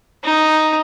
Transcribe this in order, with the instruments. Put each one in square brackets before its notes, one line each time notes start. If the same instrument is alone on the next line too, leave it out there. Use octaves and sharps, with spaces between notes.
[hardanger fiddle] D#4